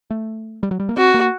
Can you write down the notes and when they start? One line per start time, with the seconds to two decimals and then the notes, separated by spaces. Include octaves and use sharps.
0.10 A3
0.63 G3
0.71 F#3
0.80 G3
0.89 A#3
0.97 C4 F#4
1.14 A#3